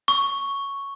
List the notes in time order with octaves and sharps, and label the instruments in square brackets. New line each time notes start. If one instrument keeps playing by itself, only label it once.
[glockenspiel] C#6